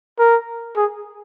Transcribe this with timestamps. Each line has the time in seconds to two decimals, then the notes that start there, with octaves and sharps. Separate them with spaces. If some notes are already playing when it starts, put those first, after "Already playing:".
0.19 A#4
0.77 G#4